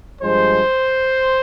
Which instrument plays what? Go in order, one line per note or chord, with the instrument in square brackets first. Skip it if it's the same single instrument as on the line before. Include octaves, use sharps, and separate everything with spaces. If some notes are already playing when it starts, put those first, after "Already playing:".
[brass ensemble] G2 F3 G#3 C5